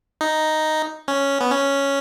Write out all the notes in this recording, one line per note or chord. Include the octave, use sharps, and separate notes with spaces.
D#4
C#4
B3
C#4